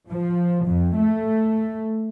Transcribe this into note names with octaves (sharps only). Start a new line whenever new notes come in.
F3
F2
A3